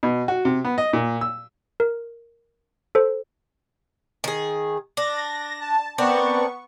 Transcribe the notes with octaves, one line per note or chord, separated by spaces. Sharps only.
B2
F#4
C3
B3
D#5
A#2
E6
A#4
A4 C5
D#3 G#4
D4 A#6
A5
B3 C4 D4 A#4 C#6